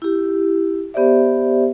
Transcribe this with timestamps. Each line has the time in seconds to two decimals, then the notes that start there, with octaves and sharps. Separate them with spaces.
0.02 E4 G4
0.94 B3 G4 C5 D5 E5